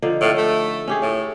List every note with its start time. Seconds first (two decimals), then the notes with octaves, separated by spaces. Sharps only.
0.02 D3 F3 D#4
0.21 A2 A4 F5 G5
0.38 A3
0.88 C#4 G4 G#4
1.02 A2